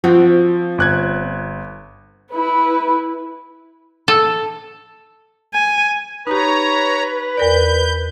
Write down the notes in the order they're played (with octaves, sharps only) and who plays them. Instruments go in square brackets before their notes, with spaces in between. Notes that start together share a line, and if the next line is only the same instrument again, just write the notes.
[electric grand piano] F3 [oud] C4 F4 F#4
[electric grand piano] G1 F#6 G#6
[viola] E4 B4
[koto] A4
[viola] G#5
[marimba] D#4 G4 [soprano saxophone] B4 [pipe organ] C#5 A#5
[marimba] E2 A#4 D5 [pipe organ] G6